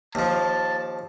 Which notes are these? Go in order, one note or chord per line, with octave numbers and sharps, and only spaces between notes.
D#2 F3 A5